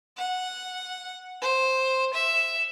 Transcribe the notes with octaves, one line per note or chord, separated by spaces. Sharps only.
F#5
C5
E5